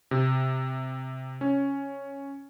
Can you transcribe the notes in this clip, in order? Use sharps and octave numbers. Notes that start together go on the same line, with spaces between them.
C3
C#4